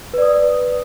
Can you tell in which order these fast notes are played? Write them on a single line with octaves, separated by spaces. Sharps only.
B4 D5 D#6